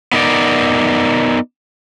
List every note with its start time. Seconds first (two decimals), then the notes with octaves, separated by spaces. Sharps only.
0.13 B3 D#4 A#4 D5